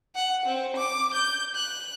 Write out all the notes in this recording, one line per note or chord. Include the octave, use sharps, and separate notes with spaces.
F#5
C4
D6
G6
F#6